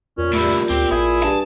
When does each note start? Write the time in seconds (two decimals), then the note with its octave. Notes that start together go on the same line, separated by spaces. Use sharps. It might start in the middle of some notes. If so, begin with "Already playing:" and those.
0.18 E2 A#2 C#4
0.33 A2 G3 E4
0.70 D2 C4 G4
0.91 A1 E4 G#4
1.23 G2 A5